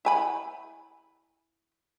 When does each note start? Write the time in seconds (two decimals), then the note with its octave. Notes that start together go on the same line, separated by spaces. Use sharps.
0.05 E4 G#5 B5